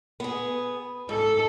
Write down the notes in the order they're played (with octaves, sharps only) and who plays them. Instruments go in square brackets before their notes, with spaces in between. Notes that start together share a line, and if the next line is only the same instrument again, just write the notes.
[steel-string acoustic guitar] B3 G#4
[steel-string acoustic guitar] G#2 [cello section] A4